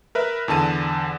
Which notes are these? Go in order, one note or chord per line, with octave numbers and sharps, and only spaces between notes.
A#4 B4 E5
E2 D3 A5 D#7